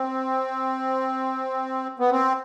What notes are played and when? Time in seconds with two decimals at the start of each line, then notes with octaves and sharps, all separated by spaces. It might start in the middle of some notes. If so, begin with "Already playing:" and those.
Already playing: C4
1.99 B3
2.11 C4